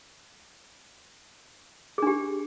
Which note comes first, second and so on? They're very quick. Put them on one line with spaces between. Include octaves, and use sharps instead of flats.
G#4 D4 G4